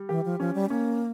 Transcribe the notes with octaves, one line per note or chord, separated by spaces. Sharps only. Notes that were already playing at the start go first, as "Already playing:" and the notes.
Already playing: G3
E3 G4
F3
F3 C#4
G3
A#3 C#4